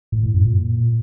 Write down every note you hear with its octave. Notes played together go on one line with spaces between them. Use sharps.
A2
A2
F#2
A#2